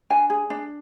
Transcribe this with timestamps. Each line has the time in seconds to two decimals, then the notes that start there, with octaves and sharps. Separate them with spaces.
0.10 D4 G#5
0.30 G#4
0.50 D4